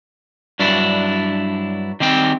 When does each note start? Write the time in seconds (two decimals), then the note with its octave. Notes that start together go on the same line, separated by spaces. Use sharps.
0.59 G2 F#3 D4 E4
2.00 D#3 G3 C4 G5